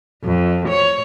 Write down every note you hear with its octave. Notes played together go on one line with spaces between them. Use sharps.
F2
C#5